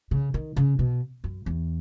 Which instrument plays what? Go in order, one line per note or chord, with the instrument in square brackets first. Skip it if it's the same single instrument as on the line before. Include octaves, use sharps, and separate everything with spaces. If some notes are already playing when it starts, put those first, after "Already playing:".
[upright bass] C#3
D#3
C#3
B2
F#2
E2